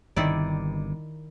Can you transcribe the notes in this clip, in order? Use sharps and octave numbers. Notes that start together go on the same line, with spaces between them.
G1 G2 C3 D#3 E4 D5